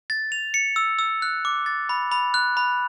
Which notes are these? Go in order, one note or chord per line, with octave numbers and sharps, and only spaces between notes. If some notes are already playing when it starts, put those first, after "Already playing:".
A6
F7
C#7
E6
E6
F#6
D6
A6
B5
B5
F#6
B5